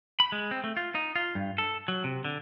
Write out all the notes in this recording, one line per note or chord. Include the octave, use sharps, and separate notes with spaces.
B5
G#3
C4
A3
F4
D#4
F4
G2
A4
F#3
C3
D3